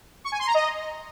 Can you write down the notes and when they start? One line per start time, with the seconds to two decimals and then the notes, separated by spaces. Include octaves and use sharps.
0.24 C#6
0.32 G#5
0.39 C6
0.47 A#5
0.54 D#5